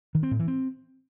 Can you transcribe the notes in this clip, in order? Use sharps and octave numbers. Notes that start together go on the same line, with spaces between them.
D#3
C4
A2
E3
C4